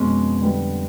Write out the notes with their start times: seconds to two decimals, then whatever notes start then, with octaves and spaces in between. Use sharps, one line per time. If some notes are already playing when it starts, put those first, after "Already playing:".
Already playing: F2 B2 G#3 C#4
0.41 D3 G3 B3